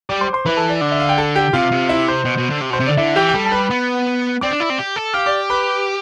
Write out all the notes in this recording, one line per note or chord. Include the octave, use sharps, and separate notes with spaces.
G3 D5 D6
C5 C6
C5 C6
E3 B4 B5
A4 A5
D5
D3
E5
F5
G5
A4 A5
G4 G5
C3 F4 F5
C3
E4 E5
C5
B2
B2
D3
C3
B2 C5
C3
D3 D5
D3 E4 E5
E3 G4 G5
G5
G3 A4 A5
A5
B4 B5
B3
C4 D5 D6
D4
E4
C4
G4
A4
G4 F5 F6
D5 D6
B4 B5